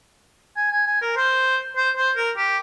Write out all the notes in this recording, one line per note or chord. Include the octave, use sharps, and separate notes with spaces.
G#5
G#5
G#5
A#4
C5
C5
C5
A#4
G4